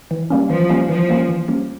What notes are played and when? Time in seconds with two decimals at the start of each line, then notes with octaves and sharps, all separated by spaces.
0.11 E3
0.30 G3 A#3 C#4
0.50 E3 F3
0.69 G3 A#3 C#4
0.89 E3 F3
1.09 G3 A#3 C#4
1.29 E3
1.48 G3 A#3 C#4